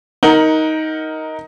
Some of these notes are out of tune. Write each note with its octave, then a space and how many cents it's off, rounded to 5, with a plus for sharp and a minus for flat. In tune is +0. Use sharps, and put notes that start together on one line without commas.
D#4 +15 A#4 +0 F#5 +0